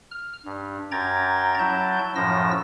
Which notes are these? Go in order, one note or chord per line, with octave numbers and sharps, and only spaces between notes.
F6
G2
F#2 G5 A#5 G#6 A6
F#3 E4 A5 G6
F#2 A2 F3 E6 A#6